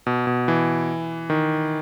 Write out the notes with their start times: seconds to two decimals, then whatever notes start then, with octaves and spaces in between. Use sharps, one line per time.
0.07 B2
0.27 B2
0.48 E3
1.30 D#3